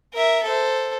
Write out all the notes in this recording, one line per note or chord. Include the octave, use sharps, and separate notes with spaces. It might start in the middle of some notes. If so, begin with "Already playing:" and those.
A#4 E5
A4 C5